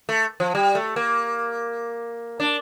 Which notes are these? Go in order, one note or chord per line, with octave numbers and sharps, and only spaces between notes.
A3
F3
G3
A3
A#3
D4